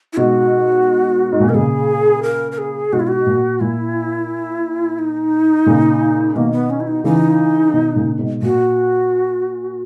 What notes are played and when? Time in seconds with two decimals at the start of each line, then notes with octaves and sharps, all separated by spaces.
0.13 E4
0.17 G#2 B2 F#4
1.32 G#2
1.40 A#2
1.47 B2 A#4
1.55 A#2 C#3 G#4
2.23 A#4
2.52 A#4
2.58 G#4
2.93 G#2 B2 F#4
3.00 E4
3.07 F#4
3.27 A#2
3.61 A#2 E4
4.99 D#4
5.67 A#2 C#3
6.36 B2 D#3 A#3
6.53 B3
6.70 C#4
6.80 E4
6.88 D#4
7.04 C#3 E3 D#4
7.73 B2 D#3
7.96 A#2 C#3
8.19 G#2 B2
8.42 A#2 F#4